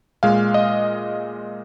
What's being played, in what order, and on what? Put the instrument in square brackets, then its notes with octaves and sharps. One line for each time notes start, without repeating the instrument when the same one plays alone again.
[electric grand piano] A#2 G#3 F5
D#5